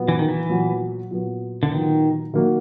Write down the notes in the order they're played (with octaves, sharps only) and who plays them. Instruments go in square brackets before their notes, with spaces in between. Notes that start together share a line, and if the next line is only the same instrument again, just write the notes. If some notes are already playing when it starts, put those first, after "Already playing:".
Already playing: [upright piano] A#2 F#3 B3
[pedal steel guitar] E3
D#3
E3
[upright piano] A#2 F#3 B3
A#2 F#3 B3
[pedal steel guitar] D3
[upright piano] A#2 F#3 B3 [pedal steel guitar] D#3
[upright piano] D#3 F#3 A#3 D#4 F#4